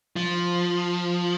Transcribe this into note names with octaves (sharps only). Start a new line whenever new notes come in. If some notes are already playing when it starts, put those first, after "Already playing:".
F3